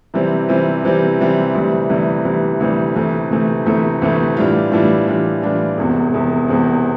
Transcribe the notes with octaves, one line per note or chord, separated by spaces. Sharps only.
C3 E3 G3 C4
C3 E3 G3 C4
C3 E3 G3 C4
C3 E3 G3 C4
D2 C3 E3 G3
D2 C3 E3 G3
D2 C3 E3 G3
D2 C3 E3 G3
D2 C3 E3 A3
D2 C3 E3 A3
D2 C3 E3 A3
D2 C3 E3 A3
A2 E3 G3 D4 F4
A2 E3 G3 D4 F4
A2 E3 G3 D4 F4
A2 E3 G3 D4 F4
E1 E2 C3
E1 E2 C3
E1 E2 C3